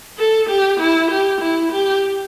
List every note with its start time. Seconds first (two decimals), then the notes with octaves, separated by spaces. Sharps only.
0.19 A4
0.49 G4
0.80 E4
1.11 G4
1.41 E4
1.72 G4